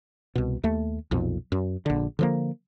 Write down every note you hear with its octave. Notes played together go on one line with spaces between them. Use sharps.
C2 B2
D#2 A3
B1 F2 A#2
F#2
A#1 D3
D3 F3 A#3